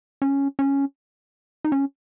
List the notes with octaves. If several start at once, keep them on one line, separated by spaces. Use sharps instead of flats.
C#4
C#4
D#4
C#4